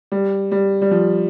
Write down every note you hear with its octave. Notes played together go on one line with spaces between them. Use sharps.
G3
G3
G3
F3